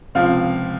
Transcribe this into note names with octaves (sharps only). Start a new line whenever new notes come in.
C#2 C3 F3 F5
F5